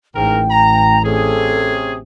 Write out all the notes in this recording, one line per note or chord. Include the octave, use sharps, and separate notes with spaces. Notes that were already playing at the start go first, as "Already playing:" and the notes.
A1 G#2 A#4 G5
A#5
C3 C#4 G#4 A4